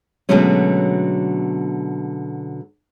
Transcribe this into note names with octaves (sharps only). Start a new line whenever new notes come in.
B2 D3 F#3 G#3 A3 C#4